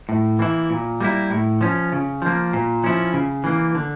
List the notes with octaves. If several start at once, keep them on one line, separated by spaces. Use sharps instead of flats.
A2
E3 A#3 E4
A#2
G3 A#3 E4
A2
F3 C#4
C#3
F3 A#3
A#2
F3 C#4 E4
C#3
E3 A#3
D3